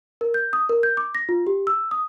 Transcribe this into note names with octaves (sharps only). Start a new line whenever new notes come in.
A#4
G6
D#6
A#4
G6
D6
A#6
F4
G4
E6
D#6